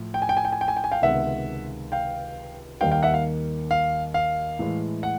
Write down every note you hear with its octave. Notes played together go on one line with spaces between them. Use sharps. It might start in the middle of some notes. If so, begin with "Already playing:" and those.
Already playing: A2 F3
G5
G#5
G5
G#5
G5
G#5
G5
G#5
G5
G#5
F5 G5
C#2 C3 D#3 G#3 B3 E5 F#5
F5 G5
D#2 D#3 G3 A#3 D#4 F5 G5
F5 G5
E5 F#5
F5
F5
F5
A2 E3 G#3
F#5